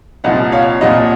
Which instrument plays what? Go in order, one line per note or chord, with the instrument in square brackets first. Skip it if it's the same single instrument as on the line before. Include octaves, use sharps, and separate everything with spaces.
[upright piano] C2 A#2 F3 [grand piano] D#5 F#5
[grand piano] C#5 F5
[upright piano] C2 A#2 F3 [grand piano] D#5 F#5